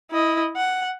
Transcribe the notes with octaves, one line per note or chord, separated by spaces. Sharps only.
E4 D#5
F#5